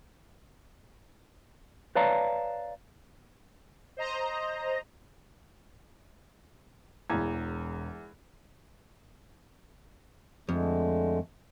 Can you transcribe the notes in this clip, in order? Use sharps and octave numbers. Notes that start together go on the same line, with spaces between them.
B4 C#5 D5 F5 A5 A#5
C5 D#5 A#5
E1 E2 A#5 G#6
F2 D3 G#3 A3